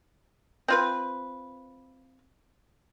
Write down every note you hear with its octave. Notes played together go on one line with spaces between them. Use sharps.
C4 F4 B4